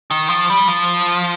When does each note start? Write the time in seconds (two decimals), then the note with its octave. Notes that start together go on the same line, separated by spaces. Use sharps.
0.11 D#3
0.30 F3
0.50 G3
0.68 F3